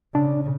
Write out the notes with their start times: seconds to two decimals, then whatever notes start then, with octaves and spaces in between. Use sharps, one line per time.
0.14 C#3 D4